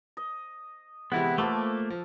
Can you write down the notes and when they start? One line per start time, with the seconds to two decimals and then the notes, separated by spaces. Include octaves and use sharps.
0.17 D#5
1.12 C3 E3 G#3 B3 E4 F#5
1.38 F3 A3 A#3 A4 B4 D6
1.90 F3